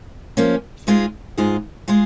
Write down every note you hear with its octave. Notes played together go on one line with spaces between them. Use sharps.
F3 A#3 C#4
G#2 G#3 F4 G#4
G#2 G#3 F4 G#4
G#3 F4 G#4